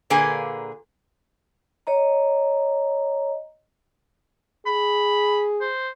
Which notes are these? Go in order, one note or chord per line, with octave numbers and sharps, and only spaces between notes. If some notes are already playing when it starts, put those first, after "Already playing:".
A#2 D3 A#3 G#4 B4 G#5
C#5 D#5 A#5
G#4 B5
C5